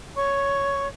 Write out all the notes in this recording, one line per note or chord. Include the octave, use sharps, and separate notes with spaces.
C#5 C#6